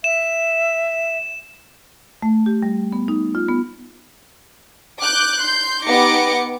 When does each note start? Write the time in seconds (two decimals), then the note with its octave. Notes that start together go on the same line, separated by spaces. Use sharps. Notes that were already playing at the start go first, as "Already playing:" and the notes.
0.04 E5 E7
2.22 A3
2.46 G4
2.63 G3
2.93 B3
3.08 D#4
3.35 F4
3.48 B3
5.01 D6 F#6 G6
5.39 C6 G6
5.85 B3 D#4 G4 D6 A#6 C#7